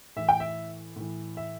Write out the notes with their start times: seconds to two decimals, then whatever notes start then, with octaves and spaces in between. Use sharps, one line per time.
0.16 A2 E3 E5
0.29 G5
0.40 E5
0.96 A2 E3
1.37 E5